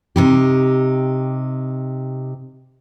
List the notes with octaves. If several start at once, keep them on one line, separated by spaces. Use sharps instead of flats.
C3 D#4 G4